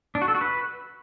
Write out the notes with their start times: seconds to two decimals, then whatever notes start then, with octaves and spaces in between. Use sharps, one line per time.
0.15 D4
0.22 F#4
0.28 A4
0.35 F#4
0.41 B4